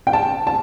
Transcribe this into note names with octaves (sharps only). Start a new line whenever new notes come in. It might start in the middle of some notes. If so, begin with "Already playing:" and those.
G5
A5
A5